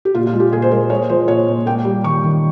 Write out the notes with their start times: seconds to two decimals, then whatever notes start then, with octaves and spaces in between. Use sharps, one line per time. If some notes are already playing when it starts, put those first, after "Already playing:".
0.05 G4
0.15 A#2 F4
0.27 F4
0.33 G#3
0.40 G4
0.52 A#2 G#4
0.62 C5
0.71 G#3 A#4
0.90 G#3 C#5
1.09 F3 C5
1.28 A#2 C#5
1.48 A#2
1.66 A#3 G5
1.85 G3
2.04 D#3 C#6
2.24 D#3